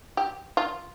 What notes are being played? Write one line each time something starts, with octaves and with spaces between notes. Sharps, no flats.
G4
F4